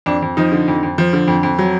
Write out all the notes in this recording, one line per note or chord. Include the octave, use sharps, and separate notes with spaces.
F2 D4
F2
F3 D#4
D3
F2
F2
F3
D3
F2
F2
F#3